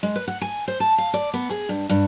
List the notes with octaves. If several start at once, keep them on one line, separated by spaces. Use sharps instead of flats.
G#3
B4
F#5
G#5
C5
A5
F5
D5
B3
G#4
G2
G2